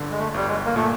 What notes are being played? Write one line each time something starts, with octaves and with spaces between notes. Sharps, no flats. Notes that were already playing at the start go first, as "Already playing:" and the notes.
Already playing: G1 G2 D3
G#3
A3
G1 G3
G#3
A#3
A#2 A3